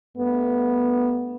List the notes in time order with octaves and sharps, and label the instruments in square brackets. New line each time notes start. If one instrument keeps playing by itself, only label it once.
[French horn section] G2 A3 B3